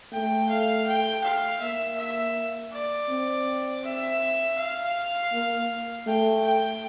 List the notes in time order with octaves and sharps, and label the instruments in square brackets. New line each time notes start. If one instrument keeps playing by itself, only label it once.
[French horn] A3 [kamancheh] G5
[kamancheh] F5
G5
F5
[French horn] A#3 [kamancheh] E5
[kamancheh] E5
D5
[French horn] C4
[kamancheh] E5
F5
[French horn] A#3
[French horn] A3 [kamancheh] G5
[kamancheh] G5